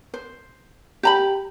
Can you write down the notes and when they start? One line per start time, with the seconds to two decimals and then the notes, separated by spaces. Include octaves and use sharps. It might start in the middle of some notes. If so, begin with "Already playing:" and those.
0.14 C5
1.03 G4 A#5 B5